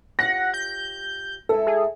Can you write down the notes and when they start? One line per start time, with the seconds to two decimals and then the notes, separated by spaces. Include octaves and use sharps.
0.19 F4 G4 C#5 F#5 A#6
0.54 G6
1.49 G#3 E4 A4
1.67 G#4